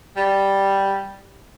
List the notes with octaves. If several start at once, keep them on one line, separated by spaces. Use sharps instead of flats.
G3